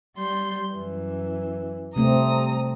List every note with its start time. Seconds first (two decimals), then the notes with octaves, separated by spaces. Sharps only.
0.17 G3 C6 G6
0.74 F#2 E3
1.96 C3 G3 A3 C4 A#5 D#6